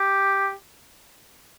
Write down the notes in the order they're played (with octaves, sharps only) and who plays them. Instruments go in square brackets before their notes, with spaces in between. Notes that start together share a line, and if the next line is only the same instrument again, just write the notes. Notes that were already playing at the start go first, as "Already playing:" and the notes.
Already playing: [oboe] G4